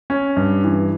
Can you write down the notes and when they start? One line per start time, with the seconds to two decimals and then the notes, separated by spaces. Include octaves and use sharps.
0.10 C#4
0.37 G2
0.64 E3